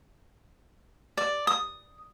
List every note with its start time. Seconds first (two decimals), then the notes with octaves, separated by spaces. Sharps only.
1.17 D5
1.47 D#6